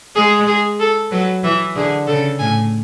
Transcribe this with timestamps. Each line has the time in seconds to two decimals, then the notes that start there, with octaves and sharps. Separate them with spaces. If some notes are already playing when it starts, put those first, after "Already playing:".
0.16 G#3 G#4
0.47 G#4
0.79 A4
1.11 F#3 B4
1.44 E3 E5
1.76 D3 G#4
2.07 C#3 A4
2.39 A2 G#5